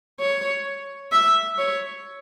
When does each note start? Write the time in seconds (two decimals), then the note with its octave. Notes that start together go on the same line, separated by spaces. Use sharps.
0.20 C#5
1.12 E5
1.58 C#5